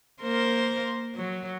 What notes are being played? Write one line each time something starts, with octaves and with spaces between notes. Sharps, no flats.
A#3 A#4 C5
F#3